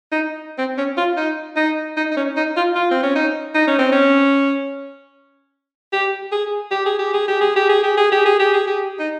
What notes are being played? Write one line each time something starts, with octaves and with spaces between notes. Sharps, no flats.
D#4
C4
C#4
F4
D#4
D#4
D#4
D#4
C#4
D#4
F4
F4
C4
C#4
D#4
D#4
C#4
C4
C#4
G4
G#4
G4
G#4
G4
G#4
G4
G#4
G4
G#4
G4
G#4
G4
G#4
G4
G#4
G4
D#4